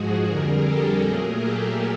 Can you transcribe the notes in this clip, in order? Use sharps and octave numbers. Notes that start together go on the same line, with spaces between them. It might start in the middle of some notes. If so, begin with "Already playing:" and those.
Already playing: G#2 F3 G#3 F#4 G#4
F2 D3 G3 G#4 A#4
G4 A4
A#2 F#3 A3 G#4 A#4
G4 A4